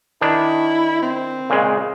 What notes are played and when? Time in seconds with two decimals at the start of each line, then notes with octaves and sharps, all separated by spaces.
0.21 D#3 D4 E4
1.02 C4
1.50 A#2 C#3 G#3